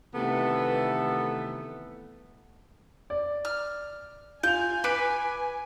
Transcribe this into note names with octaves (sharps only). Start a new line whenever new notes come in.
C3 D#3 E3 A3 B3 A4
D5
F6
F4 G#5 G6 F7
B4 D6 D7